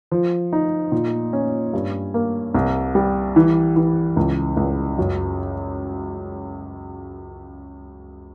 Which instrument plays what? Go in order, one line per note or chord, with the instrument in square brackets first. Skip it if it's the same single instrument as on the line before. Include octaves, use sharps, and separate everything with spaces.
[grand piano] F3
D#4
A#2
C#4
G2
A#3
C2
G3
E3
E3
C#2
C#2
F#2